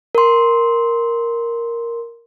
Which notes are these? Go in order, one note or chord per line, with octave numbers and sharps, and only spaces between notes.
A#4 C6